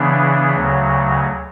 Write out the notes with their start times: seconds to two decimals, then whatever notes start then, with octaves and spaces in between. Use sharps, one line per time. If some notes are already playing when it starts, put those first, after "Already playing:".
Already playing: C#3 E3 B3 D4
0.54 D2 C#3 F#3